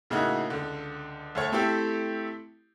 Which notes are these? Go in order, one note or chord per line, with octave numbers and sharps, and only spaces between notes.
A2 C#3 A#3 D#4 E4 F#4
C#2 D3
D2 A4 C#5
A3 C4 E4 G4 A4